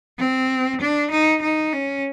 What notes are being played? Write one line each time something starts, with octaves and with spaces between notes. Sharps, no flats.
C4
D4
D#4
D#4
C#4